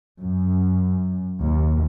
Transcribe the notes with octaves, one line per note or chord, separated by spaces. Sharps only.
F#2
D#2